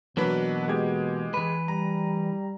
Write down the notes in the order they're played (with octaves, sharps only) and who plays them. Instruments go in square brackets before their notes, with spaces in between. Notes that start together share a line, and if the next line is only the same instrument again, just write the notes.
[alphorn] B2 [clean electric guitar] E3 A#3 [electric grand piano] F#3 D4 B4
[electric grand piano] G#3 G4 G#6
[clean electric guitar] E3 B4
[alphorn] G3 [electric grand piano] A#5